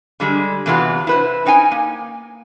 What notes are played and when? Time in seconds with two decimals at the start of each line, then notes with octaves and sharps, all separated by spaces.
0.20 D3 G3 G#3
0.66 E2 C3 E3 G#3 F4 F#4
1.07 E4 B4 C5
1.46 C#4 D#4 G5 G#5
1.71 A#3